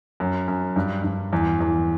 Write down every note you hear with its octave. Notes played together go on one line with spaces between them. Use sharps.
F#2
F#2
G2
G2
E2
E2